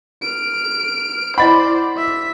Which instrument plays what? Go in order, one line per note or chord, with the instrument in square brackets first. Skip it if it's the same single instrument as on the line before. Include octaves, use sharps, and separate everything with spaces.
[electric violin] F6 D7
[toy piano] E4 D#5 F#5 [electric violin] C5 D5 [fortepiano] B5
[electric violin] E5 B6